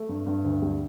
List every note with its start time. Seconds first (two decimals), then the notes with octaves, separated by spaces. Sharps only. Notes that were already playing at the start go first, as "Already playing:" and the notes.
Already playing: A3
0.09 G2
0.26 G2
0.44 D2
0.62 G3